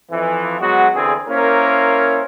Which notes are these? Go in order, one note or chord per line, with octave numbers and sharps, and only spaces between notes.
F2 E3
F#3 G#3 B3 F#4
E2 D3 C4 G#4
A#3 C#4 E4 A#4 C5